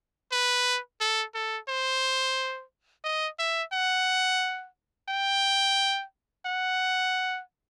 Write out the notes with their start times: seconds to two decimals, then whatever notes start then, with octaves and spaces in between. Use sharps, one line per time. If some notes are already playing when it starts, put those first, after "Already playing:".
0.32 B4
1.01 A4
1.35 A4
1.68 C5
3.04 D#5
3.39 E5
3.73 F#5
5.09 G5
6.46 F#5